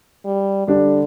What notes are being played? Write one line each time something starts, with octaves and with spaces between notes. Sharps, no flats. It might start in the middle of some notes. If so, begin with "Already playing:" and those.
G3
D3 G3 D4 G4 D5